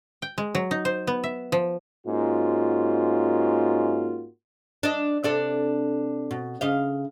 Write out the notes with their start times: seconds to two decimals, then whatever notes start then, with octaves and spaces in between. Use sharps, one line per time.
0.22 G5
0.38 G#3
0.55 F#3
0.71 D#4
0.85 C5
1.07 B3
1.24 E5
1.52 F3
2.07 G#2 A#3 C#4 F4 F#4
4.83 D4 D#5
5.23 C3 D4 A4
6.31 B2
6.61 C#3 D#5 F5